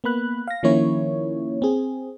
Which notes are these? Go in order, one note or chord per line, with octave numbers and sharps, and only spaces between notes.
A#3 B3 B5 F#6
F5 A#6
D#3 F3 A#3 C#4 E4 C#5
C4 G#4